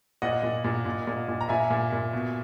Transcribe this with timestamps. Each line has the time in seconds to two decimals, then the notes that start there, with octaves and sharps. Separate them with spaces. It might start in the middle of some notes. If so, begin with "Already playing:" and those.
0.22 A#2 D#5 F#5
0.43 A#2
0.64 A#2
0.85 A#2
1.07 A#2
1.28 A#2
1.41 A#5
1.49 A#2 E5 G#5
1.70 A#2
1.92 A#2
2.13 B2